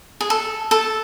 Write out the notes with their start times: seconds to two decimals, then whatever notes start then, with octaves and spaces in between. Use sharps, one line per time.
0.21 G#4
0.30 A4
0.71 A4